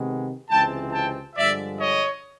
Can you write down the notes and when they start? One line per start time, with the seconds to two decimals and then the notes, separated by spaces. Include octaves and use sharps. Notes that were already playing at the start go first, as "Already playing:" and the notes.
Already playing: C3 D#3 G#3 B3
0.48 C#2 C3 E3 G#3 C4 G5 A5
0.92 G5 A5
1.36 G2 D3 F3 G#3 D5 E5
1.80 C#5 D#5